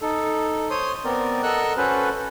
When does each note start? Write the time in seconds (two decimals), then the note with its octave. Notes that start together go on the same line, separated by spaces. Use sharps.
0.02 D#4 A4
0.70 C5 C#5 C6 D#6
1.04 B3 C4 A#4 D5
1.43 A4 A#4 D#5 F#5 E6 F#6
1.77 C#4 F#4 A4 B4 C5